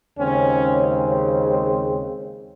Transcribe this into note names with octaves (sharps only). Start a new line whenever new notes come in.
D#2 C#3 G#3 C4 C#4